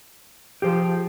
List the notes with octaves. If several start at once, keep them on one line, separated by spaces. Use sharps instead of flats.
F3 G4 G#4 C5